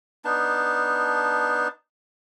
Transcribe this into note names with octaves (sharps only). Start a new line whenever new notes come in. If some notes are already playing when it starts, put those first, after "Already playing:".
B3 D4 D#4 A5